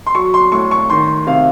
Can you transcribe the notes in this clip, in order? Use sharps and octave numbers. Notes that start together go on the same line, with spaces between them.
C6
F#3 C#6
C6
A2 C#6
C#6
D#3 C6
C3 F5